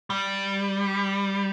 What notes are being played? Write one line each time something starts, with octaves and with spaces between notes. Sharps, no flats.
G3